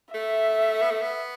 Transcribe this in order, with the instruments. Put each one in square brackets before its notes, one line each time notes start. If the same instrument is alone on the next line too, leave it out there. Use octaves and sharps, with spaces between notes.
[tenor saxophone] A3 [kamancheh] E5
[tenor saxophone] B3
A3
B3